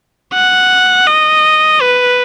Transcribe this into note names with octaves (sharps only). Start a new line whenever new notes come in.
F#5
D#5
B4